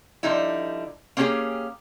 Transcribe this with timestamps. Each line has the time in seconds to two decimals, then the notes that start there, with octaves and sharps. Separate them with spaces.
0.23 D3 F3 G3 D#4 E4
1.17 A#3 C4 C#4 D#4 G4 G#4